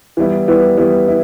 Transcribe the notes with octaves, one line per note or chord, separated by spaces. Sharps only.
E3 G3 B3 E4
E3 G3 B3 E4
E3 G3 B3 E4
E4